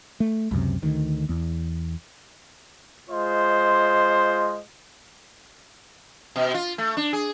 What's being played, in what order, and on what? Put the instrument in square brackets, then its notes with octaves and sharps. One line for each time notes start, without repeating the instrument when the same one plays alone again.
[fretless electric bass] A3
C#2 F#2 C3
D2 D#3
E2
[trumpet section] G#3 F4 C5 D#5
[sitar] B2
F4
A3
D4
G#4